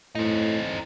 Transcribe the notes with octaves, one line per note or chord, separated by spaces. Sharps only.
A2 C4 D#4